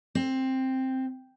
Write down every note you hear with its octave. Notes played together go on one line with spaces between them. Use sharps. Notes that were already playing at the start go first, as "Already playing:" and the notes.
C4